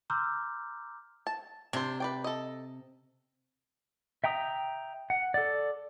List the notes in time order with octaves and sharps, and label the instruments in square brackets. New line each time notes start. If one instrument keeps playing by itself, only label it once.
[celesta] A#5 C6 D6 E6 F6 G6
[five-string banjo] A5
[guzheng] C3 [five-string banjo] D4 C5
[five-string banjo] B4 D5 G5
A4 D#5
[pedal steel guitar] E5 G5 A#5 D#6
F#5
A4 D5